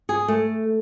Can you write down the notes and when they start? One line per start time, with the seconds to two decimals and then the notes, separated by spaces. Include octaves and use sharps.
0.09 G#4
0.28 A3